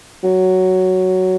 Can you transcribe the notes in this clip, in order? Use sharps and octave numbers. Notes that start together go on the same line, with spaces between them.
F#3